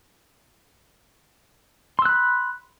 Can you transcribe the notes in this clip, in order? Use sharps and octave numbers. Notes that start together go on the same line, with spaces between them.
B5 C6 E6 F#6